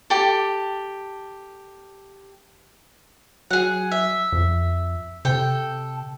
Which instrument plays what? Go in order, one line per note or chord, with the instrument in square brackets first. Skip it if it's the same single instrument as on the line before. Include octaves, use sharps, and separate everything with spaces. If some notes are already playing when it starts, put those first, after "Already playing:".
[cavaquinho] G4 A4
[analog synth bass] F#3 [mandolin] G#4 F#5
[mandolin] E5
[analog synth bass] F2
[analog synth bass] C3 [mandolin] A4 G5